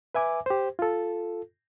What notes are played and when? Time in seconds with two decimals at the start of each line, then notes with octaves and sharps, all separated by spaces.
0.15 B4 E5 G#5 D6
0.46 G4 C5
0.79 F4 A4